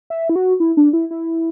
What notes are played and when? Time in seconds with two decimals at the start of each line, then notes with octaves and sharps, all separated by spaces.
0.10 E5
0.29 E4
0.36 F#4
0.60 E4
0.77 D4
0.93 E4
1.11 E4